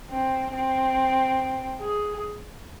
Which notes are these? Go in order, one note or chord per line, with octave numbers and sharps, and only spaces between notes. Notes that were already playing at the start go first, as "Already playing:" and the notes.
C4
C4
G#4